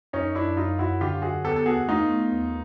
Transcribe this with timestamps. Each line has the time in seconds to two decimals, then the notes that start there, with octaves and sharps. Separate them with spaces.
0.13 F#2 C#4 D#4
0.35 F#2 D4 E4
0.57 F#2 D#4 F4
0.79 F#2 E4 F#4
1.01 D3 F4 G4
1.22 F#2 F#4 G#4
1.44 B3 G4 A4
1.56 A4
1.66 B3 F#4 G#4
1.88 A3 D#4 F4
2.10 A3
2.32 D#2